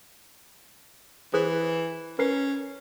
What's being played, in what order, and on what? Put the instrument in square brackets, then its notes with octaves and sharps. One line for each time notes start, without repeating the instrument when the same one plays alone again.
[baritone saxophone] E3 [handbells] G#4 B4 C5
[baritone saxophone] C#4 [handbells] A#4 B4 C7